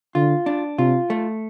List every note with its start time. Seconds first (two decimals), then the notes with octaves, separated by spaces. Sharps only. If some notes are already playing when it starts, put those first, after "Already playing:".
0.15 D3 F4
0.46 D4
0.78 C3 F4
1.10 A3